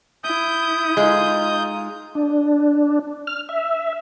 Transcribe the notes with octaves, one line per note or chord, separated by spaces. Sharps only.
E4 D#6 G6
G#3 D#4 F4
D4
F6
E5